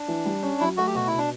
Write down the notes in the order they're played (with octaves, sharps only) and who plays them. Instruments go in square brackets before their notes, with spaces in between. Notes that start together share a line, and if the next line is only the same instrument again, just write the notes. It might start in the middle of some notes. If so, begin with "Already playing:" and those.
Already playing: [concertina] D4
[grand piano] E3
G3
C#4
[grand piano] F#3 [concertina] E4
[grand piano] A3 [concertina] F#4
[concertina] G4
[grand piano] B2 [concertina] F#4
[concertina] E4
[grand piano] B2
[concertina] D4